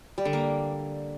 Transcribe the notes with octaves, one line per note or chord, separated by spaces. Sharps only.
G3
D3
A#3